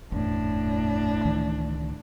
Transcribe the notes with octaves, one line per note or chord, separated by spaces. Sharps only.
F#1 E2 A2 D4
C#2 D#3 E3